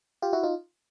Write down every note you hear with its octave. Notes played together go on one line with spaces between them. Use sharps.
F4 G4
E4 F#4
D#4 F4